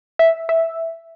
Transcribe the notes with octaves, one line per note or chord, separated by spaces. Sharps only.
E5
E5